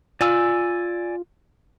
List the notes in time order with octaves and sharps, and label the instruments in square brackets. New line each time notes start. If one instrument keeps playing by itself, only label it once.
[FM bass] F4 [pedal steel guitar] D5 G#5 E6